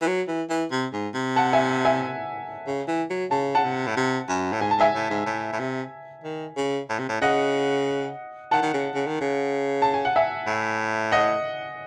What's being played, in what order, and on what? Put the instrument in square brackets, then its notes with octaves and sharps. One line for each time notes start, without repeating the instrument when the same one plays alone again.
[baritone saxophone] E3
F#3
E3
E3
C3
G#2
C3
[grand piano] F#5 A5
E5 G#5
E5 G#5
[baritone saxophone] C#3
E3
F#3
[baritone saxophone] C#3 [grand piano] A5
[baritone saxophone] C#3 [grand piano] F#5 A5
[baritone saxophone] C3
A2
C3
F#2
A2
[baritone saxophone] G#2 [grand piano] G#5
[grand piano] A5
[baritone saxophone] G#2 [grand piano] E5 G#5
[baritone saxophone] A2
G#2
A2
A2
C3
D#3
C#3
A2
C3
A2
[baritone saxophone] C#3 [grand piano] D#5 F#5
[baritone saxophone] D#3 [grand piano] F#5 A5
[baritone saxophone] D#3
C#3
C#3
D#3
C#3
[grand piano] A5
G#5
F#5
E5 G#5
[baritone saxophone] A2
[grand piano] D#5 F#5